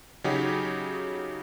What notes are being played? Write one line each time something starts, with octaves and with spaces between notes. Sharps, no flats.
C#3 F#3 D#4 F#4 G4 C#5